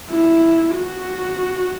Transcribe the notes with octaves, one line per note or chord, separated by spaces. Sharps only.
E4
F#4